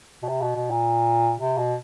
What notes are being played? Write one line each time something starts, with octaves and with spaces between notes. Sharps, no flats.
B2
C3
B2
B2
A#2
C3
B2